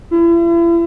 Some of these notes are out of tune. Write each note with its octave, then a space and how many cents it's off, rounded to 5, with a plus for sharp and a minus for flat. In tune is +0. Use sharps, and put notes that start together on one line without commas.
E4 +40